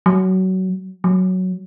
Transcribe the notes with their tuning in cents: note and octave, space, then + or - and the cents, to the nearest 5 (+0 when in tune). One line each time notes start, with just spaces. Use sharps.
F#3 +20
F#3 +0